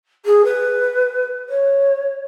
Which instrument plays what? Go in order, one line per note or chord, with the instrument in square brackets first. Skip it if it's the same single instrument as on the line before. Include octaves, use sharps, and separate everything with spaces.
[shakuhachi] G#4
B4
C#5